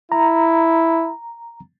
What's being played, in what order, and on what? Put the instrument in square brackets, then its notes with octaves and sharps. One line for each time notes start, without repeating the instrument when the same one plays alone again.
[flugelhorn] E4 [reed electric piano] A#5